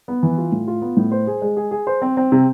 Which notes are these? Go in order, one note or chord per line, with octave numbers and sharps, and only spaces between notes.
B3
E3
F4
A2
F4
B3
A2
C5
G#4
G#3
G#4
G#4
C5
C4
C4
C3